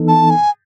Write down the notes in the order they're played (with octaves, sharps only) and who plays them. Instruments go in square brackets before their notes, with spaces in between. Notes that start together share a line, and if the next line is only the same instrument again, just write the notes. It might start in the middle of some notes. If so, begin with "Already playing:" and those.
Already playing: [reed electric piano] E3 B3 D#4 A4
[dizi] A5
G#5